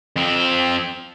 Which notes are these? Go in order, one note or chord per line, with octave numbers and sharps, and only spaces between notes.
F2 C4